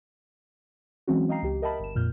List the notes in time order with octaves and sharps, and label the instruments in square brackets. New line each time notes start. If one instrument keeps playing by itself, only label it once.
[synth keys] E3 F#3 G#3 C4 C#4 F#4
D#5 F5 G5 A#5 C7
C#2 G4
A#4 D#5 E5 G5 A5 B5
G1 E7
F2 A#2 F6 G6